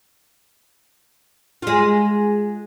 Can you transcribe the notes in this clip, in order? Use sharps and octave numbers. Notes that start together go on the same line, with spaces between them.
G#3 F4